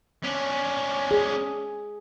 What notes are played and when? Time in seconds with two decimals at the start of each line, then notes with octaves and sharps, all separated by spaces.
0.23 C#4 D4
1.11 G#4